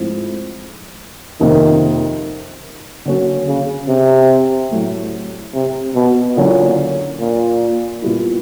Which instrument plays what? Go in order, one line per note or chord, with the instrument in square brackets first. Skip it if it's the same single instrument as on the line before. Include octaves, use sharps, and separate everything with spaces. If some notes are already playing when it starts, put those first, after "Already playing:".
Already playing: [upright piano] G#2 F3 A3 C4 E4
[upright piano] F2 C3 F3 A#3 [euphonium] D#3
[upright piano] D3 F#3 A#3 C#4 F#4
[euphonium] C#3
C3
[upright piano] A2 F#3 A3
[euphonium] C3
B2
[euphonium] A#2 [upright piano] D3 F#3 A#3 C#4 E4
[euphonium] A#2
[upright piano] A#2 G3 B3 E4